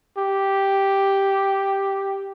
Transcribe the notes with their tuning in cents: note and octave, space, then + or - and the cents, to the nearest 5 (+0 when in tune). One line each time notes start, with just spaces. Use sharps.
G4 +0